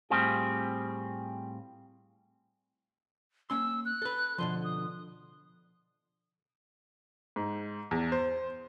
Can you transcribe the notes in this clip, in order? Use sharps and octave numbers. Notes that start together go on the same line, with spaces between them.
A2 G3 C4 F4 G4 G#4
A#3 C#4 C6 E6
F#6
A4 B4
B2 D3 F3 C6
D#6
G#2
E2
C5